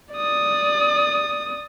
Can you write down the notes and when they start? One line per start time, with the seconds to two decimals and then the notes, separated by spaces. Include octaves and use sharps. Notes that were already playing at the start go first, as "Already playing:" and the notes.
0.14 D5 D#6